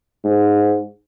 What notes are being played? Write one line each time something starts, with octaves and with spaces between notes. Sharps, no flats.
G#2